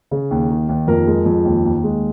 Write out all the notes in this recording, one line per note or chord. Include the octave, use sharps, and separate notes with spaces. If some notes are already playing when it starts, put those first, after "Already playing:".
C#3
D#2
D#3
D#2
F2 A#4
G#3
F2
D#2
D#2
G#3